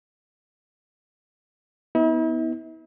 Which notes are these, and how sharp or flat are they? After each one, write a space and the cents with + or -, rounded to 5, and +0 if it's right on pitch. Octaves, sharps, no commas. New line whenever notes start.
B3 +0 E4 -45